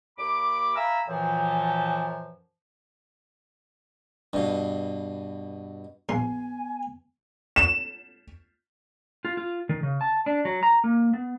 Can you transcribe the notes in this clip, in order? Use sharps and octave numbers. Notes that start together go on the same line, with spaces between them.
D#2 B5 D6
E5 F5 G#5 A#5 B5 E6
F#2 A#2 E3 F3
G2 B2
A#1 B3 G#5 C6
E7
F4
F4
D#3
C#3
A5
D4
F#3
A#5
A#3
B3